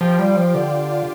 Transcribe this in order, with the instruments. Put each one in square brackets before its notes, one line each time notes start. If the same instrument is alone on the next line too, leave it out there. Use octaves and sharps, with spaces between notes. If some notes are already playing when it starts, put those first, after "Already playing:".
[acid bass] F3 [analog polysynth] G4 G5
[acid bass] G3 [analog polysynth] F4 F5
[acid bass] F3 [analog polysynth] F4 F5
[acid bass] D3 [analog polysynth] D4 D5
[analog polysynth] G4 G5
F4 F5